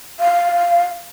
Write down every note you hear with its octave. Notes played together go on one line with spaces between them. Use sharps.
F5